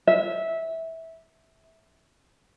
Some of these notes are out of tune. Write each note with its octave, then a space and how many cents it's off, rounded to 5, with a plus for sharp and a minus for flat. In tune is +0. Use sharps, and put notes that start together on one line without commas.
E5 -15